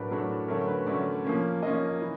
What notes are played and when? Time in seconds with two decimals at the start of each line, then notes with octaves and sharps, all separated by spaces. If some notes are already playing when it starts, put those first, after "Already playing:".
Already playing: A2 F#3 A3 D4 A#4 B4
0.11 A2 F#3 A3 D4
0.48 D3 F#3 A3 C#4 A#4
0.67 B4
0.86 D3 F#3 A3 C#4 D5
1.25 F3 A#3 C#4
1.63 F3 A#3 C#4 D#5
2.01 E3